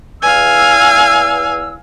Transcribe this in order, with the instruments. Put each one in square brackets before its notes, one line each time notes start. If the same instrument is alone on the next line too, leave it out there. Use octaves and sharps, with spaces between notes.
[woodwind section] E2 E6 [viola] F5 G#5